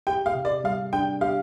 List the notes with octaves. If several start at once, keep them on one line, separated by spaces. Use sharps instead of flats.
G4 G5
F5
C3
D5
G3 F5
D4 G5
G4 F5